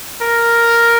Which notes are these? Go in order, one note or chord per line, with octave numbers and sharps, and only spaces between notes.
A#4